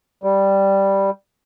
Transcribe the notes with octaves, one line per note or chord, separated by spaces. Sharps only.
G3